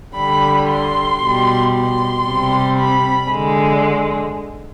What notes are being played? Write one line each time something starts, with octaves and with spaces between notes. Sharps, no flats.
D3 G3 B5
C6
B2 G3
C6
C3 G3
B5
D3 G#3